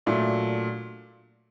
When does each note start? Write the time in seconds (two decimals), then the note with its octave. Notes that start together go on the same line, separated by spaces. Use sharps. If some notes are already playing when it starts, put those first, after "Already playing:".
0.06 A#2 F#3 A3 D4